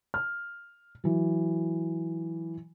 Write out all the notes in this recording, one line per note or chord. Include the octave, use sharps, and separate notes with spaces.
F6
E3 F#3